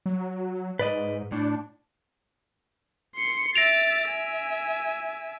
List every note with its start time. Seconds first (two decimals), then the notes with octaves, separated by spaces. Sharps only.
0.06 F#3
0.79 G#2 B4 D5 D#5
1.32 A2 D4
3.16 C6 C#7
3.56 E5 A6 A#6 D7 F7
4.06 E5 G#5